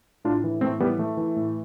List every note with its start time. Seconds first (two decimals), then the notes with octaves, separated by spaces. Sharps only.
0.25 A2 D4 F4
0.44 E3
0.61 A2 A3 C4
0.80 E3 G3 B3
0.98 E3 A3
1.17 E3
1.36 A2